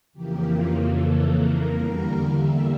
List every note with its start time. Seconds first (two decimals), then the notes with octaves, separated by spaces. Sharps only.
0.13 F2 C#3 E3 A#3 G4
0.50 F4
0.86 A4
1.22 A#4
1.60 E2 D3 G3 A#3
2.33 E5